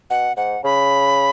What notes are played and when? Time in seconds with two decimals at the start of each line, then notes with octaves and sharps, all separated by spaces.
0.10 B2 F#5
0.37 G#2 F#5
0.64 C#3 B5